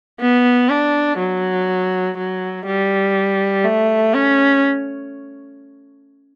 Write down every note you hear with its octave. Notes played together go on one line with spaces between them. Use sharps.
B3
D4
F#3
F#3
G3
A3
C#4